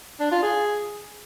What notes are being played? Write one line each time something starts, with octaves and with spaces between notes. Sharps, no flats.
D4
F4
G#4